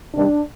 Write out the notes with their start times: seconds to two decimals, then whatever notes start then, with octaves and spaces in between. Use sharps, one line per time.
0.14 C3 D#3 G3 D4